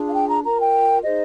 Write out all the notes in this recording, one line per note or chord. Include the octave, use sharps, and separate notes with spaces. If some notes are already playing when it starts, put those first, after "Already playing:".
Already playing: D4 F4 G#4
F5
G5
A#5
F4 A#4 A#5
G5
D#4 G#4 C5 D#5